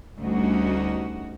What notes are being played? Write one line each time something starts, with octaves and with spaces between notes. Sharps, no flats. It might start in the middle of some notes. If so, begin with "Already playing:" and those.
D2 G3 C#4 D#4 F#4